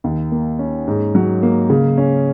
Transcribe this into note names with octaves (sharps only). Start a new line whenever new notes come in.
D#2
A#3
C#4
G#2
F#3
A#3
C#3
C#4